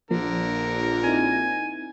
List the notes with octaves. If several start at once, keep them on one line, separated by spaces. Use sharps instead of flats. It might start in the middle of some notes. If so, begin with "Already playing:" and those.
A#1 D3 F3 A#3 A#4
C4 D#4 E4 G#5